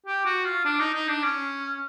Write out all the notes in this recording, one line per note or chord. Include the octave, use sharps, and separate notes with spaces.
G4
F#4
F4
D4
D#4
D#4
D4
C#4